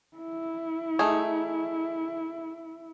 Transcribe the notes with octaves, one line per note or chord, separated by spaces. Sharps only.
E4
A3 D#4 G#4